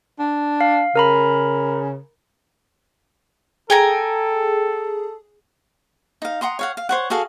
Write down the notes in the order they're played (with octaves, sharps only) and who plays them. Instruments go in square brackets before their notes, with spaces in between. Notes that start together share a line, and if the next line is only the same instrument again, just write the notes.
[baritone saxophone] D4
[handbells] F5
[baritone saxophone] C#3 [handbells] A#4 A#5 B5
[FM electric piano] G#4 [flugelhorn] A4 [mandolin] G5 G#5 A#5
[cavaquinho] D#4 F5
F#5 A#5 C6 D#6
C#5 F5 F#5
F5
C5 C#5 F#5
F#4 G#4 A4 F5